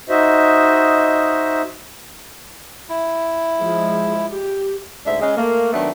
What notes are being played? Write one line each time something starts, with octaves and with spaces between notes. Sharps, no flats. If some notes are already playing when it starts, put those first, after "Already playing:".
D#4 F#4 C5 D#5 E5
E4
F3 G#3
G4
D2 G#2 D3 D4 E5
C#3 G#3
A3 A#3
D#3 F#3 A3 B3 D4